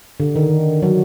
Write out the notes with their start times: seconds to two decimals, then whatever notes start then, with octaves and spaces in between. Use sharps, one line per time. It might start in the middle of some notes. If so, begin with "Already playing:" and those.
0.20 D3
0.36 D#3
0.82 F#3